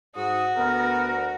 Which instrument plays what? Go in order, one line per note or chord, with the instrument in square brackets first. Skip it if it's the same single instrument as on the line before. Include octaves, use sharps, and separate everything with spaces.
[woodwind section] G#2 D#6 [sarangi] F#4
[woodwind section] D2 A#4 [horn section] B3